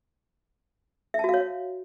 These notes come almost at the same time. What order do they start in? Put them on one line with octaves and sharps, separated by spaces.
E5 A5 F#4 F5 C#5